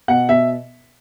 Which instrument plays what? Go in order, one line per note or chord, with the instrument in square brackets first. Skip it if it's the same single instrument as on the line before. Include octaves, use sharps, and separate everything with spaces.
[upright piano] B2 F#5
B2 E5